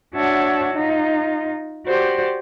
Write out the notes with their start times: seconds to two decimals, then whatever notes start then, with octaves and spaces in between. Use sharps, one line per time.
0.15 D4 F#4 C#5 E5 F#5 A5
0.74 D#4 F4
1.86 F#4 G4 C5 D5